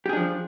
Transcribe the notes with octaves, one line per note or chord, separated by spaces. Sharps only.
F3 D4 G4 G#4